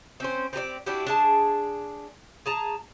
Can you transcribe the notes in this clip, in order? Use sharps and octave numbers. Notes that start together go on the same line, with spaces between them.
C4 C#4 C5
C4 G4 B4 D5
D4 E4 F#4 G4
D4 G#4 A5
G#4 A5 A#5